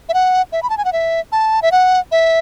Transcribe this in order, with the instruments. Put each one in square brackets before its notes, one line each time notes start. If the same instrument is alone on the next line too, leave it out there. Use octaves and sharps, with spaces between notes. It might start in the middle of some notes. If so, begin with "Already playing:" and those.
[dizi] E5
F#5
E5
B5
A5
G#5
F#5
E5
A5
E5
F#5
E5